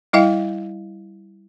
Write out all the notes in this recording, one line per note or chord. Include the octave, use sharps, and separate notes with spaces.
G3 E4 D#5 F5 G5